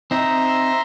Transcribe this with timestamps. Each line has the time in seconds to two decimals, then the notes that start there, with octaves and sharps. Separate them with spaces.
0.11 C4 D#4 E5 A#5 C6